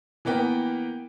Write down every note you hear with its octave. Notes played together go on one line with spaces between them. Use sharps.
E3 A#3 B3 G5